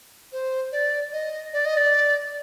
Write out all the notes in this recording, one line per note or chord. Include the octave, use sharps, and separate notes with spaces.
C5
D5
D#5
D5
D#5
D5